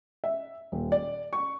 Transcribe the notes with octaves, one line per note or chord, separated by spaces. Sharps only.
E5
D#1
D5
C#6